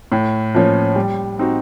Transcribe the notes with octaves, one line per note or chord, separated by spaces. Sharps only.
A2
F3 A#3 C#4
G3
C4 D#4 F#4